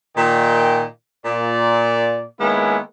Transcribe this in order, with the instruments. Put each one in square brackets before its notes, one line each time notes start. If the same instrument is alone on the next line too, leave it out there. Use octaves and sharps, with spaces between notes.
[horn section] A#2 D#3 G5
A#2 D5
D#3 G#3 A#3 B3 C#4 E4